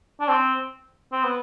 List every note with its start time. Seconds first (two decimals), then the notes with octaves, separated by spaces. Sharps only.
0.20 D4
0.29 C4
1.12 C4
1.24 B3